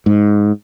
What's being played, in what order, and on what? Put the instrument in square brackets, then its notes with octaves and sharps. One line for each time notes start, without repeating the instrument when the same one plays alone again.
[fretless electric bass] G#2